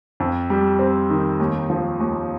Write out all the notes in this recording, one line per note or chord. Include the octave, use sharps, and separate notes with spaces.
F2
G3
C4
D#3
D#2
F3
D#2